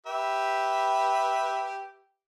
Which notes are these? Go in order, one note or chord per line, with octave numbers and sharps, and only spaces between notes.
G4 B4 E5